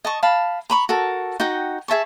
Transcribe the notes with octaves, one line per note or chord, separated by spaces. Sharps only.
D#5 A5 C#6
F5 A5 B5
A#5 B5 C#6
F#4 A4 A#4 A5
D#4 F#4 F#5 G5
G#4 E5 A5 C#6